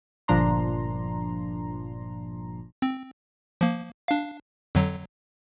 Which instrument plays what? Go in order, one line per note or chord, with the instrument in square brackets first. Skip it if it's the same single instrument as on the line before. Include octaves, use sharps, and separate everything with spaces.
[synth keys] G1 A#2 F3 D4 A#5 C6
[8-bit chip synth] C4
F3 A#3
D4 F5
F2 D3 F#3